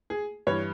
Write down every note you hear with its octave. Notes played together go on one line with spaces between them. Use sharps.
G#4
G2 E3 C#5